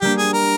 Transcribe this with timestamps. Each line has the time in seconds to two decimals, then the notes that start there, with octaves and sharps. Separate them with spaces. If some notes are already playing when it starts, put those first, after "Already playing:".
0.01 G3 A#3 D4 G4
0.17 G#4
0.33 A#4